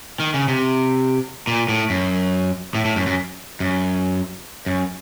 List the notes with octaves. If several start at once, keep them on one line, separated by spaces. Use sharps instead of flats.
D#3
C#3
C3
A#2
A2
F#2
A2
A2
F#2
F#2
F#2
F#2